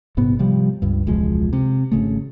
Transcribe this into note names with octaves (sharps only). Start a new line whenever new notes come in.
A#1 G#2 C3 B3
C3 F3 G3
C#2 G2
E1 C#2 F3 G#3
C3
G#1 C#3 A3